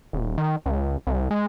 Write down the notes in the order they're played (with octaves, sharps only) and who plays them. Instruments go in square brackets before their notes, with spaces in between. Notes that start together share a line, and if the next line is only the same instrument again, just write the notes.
[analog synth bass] D#1
D#3
C#2
C2
G#3